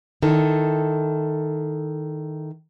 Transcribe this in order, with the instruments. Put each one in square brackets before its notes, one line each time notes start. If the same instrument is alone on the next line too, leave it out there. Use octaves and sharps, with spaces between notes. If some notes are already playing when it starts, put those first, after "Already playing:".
[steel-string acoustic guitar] D#3 E4 A4